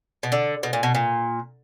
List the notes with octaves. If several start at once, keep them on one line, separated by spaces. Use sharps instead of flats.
B2
D3
B2
A#2
B2
A#2